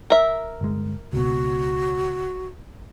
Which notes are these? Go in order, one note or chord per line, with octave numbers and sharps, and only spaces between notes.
A#4 E5
G1 G#3
C#2 B2 F#4